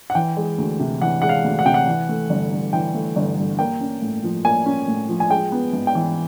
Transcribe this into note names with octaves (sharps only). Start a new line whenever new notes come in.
F#5
E3 G5
G#3
D2
C3
E3 F#5
G#3 F#5
F5
D2
F#5
C3 G5
F#5
E3
A3
G1
G2
E3 G5
A3
G1
G2
A#3 G5
C#4
A2
F3
A#3 G#5
C#4
A2
F3
G#5
G#3 G5
B3
G#2
G5
E3